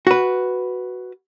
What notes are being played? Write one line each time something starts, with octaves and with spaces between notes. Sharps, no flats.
F#4 B4